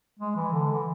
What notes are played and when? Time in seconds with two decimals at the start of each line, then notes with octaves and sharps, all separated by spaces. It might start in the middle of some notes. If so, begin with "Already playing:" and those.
0.19 G#3
0.36 E3
0.53 D3
0.71 E3